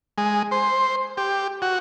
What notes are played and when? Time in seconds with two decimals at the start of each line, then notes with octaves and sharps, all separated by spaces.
0.18 G#3
0.51 C5
1.17 G4
1.62 F#4